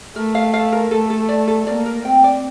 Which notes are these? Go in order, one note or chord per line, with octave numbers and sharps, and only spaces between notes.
A3 A#4
F5
F5
A#4
A3 A4
A4
D5
A4
A#3 D5
A#4
C4 G5
D5